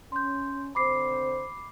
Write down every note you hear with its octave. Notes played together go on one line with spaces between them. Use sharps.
C#4 C6 G6
D3 C4 C5 B5 D6 C7